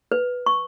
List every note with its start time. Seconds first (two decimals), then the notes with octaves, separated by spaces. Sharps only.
0.12 B4
0.46 C#6